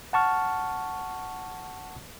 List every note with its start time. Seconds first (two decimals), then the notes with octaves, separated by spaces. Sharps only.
0.13 F#5 A5 C#6 F6